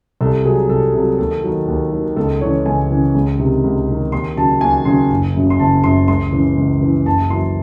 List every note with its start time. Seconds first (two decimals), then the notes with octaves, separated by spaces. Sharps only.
0.21 C2 A4
0.45 C3 F#3 G#4
0.69 C2 A4
0.94 C3 A4
0.98 F#3
1.18 D#2 A4
1.43 D#3 F#3
1.68 D#2
1.92 D#3 F#3
2.17 C#2 A4
2.41 C#3 E3 C#5
2.66 C#2 G#5
2.91 C#3 E3
3.15 C#2
3.39 C3 D#3
3.64 C#2
3.88 C3 D#3
4.12 D#2 C6
4.36 C#3 F#3 A5
4.61 D#2 G#5
4.85 C#3 F#3 C6
5.10 F#1
5.35 F#2 C#3
5.50 C6
5.60 F#1 A5
5.84 F#2 C#3 C6
6.08 C#2 C6
6.32 C#3 E3
6.57 C#2
6.81 C#3 E3
7.05 F#1 A5
7.30 F#2 E3 C6